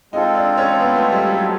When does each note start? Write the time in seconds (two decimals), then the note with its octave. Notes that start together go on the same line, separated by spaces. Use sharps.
0.13 G#3 C4 D#4 F4 A4
0.35 D4
0.57 C#4
0.80 B3
0.95 A3
1.12 G3
1.29 F#3